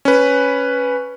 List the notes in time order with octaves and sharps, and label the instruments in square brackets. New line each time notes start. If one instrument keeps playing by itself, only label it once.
[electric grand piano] C#4 B4